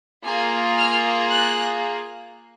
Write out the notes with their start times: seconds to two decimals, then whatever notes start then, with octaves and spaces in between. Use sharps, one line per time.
0.24 A#3 F4 G#4 G#5
0.78 F6
1.31 F#6